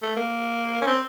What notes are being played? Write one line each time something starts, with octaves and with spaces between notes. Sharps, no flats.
A3
A#3
C#4
C4